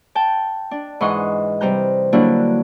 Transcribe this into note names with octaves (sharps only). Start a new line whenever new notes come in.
G5 A5
D4
G#2 E3 F#5 C6 C#6 D#6
C3 G3 A#5 G6
D3 F#3 G3 A#3 D4 E4